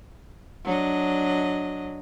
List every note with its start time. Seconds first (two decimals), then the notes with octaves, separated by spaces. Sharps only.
0.64 F#3 D4 D#5